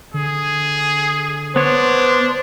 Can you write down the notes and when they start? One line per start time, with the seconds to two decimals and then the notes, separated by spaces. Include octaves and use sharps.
0.14 D3 G#4
1.56 B3 D4 C5 C#5